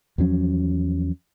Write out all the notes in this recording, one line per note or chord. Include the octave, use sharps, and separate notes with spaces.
E2 F3 F#3 C#4